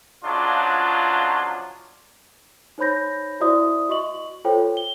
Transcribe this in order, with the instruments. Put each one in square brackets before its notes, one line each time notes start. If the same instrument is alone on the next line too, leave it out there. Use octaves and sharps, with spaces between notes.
[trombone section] C#3 F3 F#3 G#3 D4 F4
[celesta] D#4 C5 C#5 B5 G6 A#6
E4 F#4 C5 D5 E5 D#6
F#4 D#5 C#6 F#7
F4 A4 C5 C#5 G5
G7